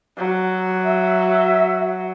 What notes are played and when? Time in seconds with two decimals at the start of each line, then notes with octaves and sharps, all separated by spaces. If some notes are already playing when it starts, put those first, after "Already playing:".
0.17 F#3
0.84 E5